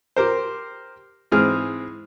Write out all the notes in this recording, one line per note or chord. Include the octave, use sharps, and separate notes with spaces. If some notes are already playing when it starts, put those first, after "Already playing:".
G4 A#4 C5
G#2 E3 C4 G#4 F6